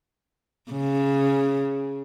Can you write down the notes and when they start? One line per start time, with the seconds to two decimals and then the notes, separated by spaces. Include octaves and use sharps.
0.71 C#3